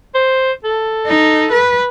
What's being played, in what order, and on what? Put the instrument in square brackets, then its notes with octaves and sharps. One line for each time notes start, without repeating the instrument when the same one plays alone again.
[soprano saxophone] C5
A4
[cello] D#4
B4